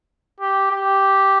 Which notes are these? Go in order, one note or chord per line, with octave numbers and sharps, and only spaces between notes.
G4
G4